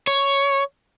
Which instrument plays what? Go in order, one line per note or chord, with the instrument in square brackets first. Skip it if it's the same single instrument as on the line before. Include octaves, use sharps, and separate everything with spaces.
[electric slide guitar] C#5